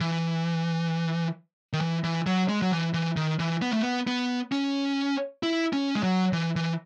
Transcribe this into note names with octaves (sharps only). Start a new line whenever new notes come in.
E3
D#3
E3
E3
F#3
G#3
F#3
E3
E3
D#3
E3
B3
A3
B3
B3
C#4
E4
C#4
G#3
F#3
E3
E3